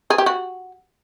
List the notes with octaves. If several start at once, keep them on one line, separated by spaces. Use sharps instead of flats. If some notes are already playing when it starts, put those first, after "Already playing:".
G#4
G4
F#4